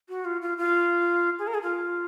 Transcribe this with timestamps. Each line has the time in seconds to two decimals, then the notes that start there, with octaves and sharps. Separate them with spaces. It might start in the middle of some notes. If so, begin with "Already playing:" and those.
0.09 F#4
0.25 F4
0.42 F4
0.57 F4
1.39 G#4
1.47 A#4
1.54 G#4
1.62 F4